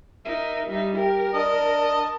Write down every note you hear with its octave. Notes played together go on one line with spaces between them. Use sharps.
D#4 A#4 E5
G3 D#4
G4 A#4
D4 D#5 A5